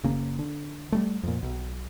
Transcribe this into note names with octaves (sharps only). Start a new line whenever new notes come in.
F#1 C#3 A#3
D3
G3 A3
F2 A#2
B1